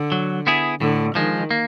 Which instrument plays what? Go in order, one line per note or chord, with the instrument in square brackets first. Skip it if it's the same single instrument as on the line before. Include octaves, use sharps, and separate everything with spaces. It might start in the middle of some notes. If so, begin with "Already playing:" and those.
Already playing: [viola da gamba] D3
[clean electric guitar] F#3
B3 E4 G#4
[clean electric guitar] A2 [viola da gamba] D3
[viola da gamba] D#3 [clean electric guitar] F3 G#3
[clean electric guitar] A#3